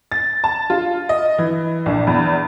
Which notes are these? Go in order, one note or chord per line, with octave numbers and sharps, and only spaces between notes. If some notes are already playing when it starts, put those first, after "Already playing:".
A6
A5
F4
D#5
E3
A#1
E2